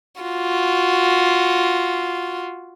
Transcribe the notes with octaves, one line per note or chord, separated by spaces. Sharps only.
F4 F#4